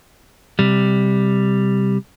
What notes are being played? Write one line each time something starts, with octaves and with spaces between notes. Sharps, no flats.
C3 G3